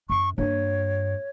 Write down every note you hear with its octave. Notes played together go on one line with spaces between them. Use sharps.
F#2 C#6
G2 A#3 C#5